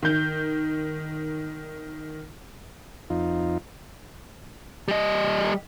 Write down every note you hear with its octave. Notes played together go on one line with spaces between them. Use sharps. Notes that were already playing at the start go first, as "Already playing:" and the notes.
D#3 G6
F2 D#4 F4
G3 D#5